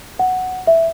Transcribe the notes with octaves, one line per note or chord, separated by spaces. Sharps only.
F#5
E5